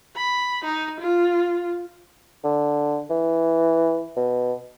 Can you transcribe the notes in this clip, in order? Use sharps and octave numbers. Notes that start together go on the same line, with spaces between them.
B5
D#4
F4
D3
E3
B2